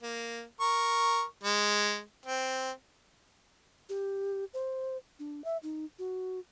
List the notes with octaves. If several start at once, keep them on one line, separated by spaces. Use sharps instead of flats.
A#3
A#4 C#6
G#3
C4
G4
C5
D4
E5
D#4
F#4